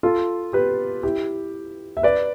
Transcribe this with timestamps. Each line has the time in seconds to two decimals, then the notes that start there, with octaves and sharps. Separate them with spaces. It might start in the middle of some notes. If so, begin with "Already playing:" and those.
0.03 F4 A4
0.53 G4 B4
1.03 E4 G4
1.97 E5
2.03 B4 D5